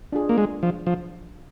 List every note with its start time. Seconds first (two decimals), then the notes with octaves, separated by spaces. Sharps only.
0.12 D4 F4 G#4
0.29 A#3
0.38 G#3
0.63 F3
0.87 F3